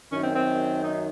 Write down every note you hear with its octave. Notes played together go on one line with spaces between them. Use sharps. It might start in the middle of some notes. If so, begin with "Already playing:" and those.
F#2 D#3 C#4
C4
C4
D#4